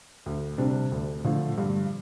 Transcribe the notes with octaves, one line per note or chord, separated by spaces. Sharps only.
D2
C3 G3 D4
D2
D3 F3 A3
G2